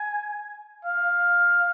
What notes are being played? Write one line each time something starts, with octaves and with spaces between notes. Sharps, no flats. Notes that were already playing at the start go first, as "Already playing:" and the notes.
Already playing: G#5
F5